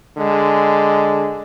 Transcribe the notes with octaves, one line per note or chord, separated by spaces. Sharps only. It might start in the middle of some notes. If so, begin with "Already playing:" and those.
D3 G#3